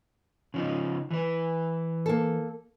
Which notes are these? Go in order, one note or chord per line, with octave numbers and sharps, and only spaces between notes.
C#3 F3 D#4
E3 B4
A#3 A4